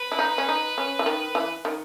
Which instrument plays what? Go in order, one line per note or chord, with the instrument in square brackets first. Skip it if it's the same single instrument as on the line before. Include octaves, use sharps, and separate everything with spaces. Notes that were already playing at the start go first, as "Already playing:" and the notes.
Already playing: [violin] B4
[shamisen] E4
D#4
C#4
D#4
C#4
E3
D#3
E3
D#3